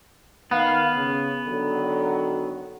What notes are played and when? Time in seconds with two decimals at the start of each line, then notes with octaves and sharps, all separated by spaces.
0.51 D#3 B3 F5
0.96 C#3
1.47 D3 D#3 F#3